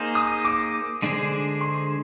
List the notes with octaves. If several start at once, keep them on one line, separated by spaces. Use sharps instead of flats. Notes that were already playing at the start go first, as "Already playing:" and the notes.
Already playing: A#3 D#4 G#4 C5
D#6
D6
D3 G#3 D4 G#4 C5
C6